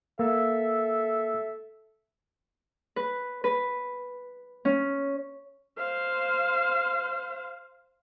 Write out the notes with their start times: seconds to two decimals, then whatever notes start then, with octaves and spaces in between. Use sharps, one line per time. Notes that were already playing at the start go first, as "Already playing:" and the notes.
0.19 A#3 A4 E5
2.96 B4
3.44 B4
4.65 C#4
5.78 C5 F5